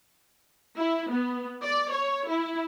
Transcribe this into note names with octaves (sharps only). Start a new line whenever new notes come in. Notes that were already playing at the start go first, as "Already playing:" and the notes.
E4
B3
D5
C#5
E4